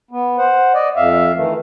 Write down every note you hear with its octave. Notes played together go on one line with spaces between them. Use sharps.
B3
C5 F#5
D5 D#5
F2 E5 F5
D#3 E3 A3